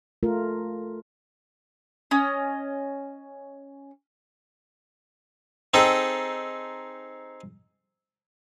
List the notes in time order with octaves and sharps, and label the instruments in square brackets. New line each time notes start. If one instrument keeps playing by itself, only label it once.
[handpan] A3 F4 A#4
[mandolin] C#4 D#5
[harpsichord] C4 D#4 G#4 A4